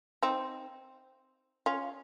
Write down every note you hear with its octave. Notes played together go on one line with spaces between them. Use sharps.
C4 D#4
C#4 F4